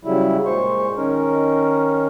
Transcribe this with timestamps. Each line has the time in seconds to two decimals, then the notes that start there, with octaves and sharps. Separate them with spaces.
0.05 C#3 F#3 G3 E4
0.46 A#2 G#3 C5 C#6
0.97 D#3 C#4 D#4 A#4